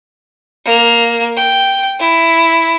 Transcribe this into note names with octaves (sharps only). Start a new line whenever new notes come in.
A#3
G5
E4